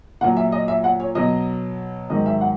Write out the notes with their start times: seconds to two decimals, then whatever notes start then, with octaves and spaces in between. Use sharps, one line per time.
0.21 A#2 F#5
0.24 F#3
0.37 E5
0.52 D#5
0.68 E5
0.84 F#5
1.00 C#5
1.15 B2 F#3 D#5
2.10 G#2 D#3 F#3 D#5
2.26 E5
2.41 F#5